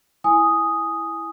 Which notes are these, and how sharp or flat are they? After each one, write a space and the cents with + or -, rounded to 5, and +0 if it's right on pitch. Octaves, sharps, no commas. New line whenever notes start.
E4 +0 G#5 +0 D#6 +0